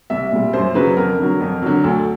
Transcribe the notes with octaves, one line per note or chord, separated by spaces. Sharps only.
C2 E5
A#2 G3
F#2 C5
C#3 F#3 B4
F2 A#4
D3 F#3
F2
D3 F#3
D2 A4